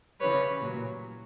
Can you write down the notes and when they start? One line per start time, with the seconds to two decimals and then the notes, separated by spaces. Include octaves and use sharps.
0.20 C#3 E3 G3 B4 C#5
0.61 A#2 F#3